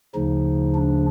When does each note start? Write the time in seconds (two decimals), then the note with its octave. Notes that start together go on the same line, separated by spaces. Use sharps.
0.15 D2 C#3 F3 D#4
0.74 D4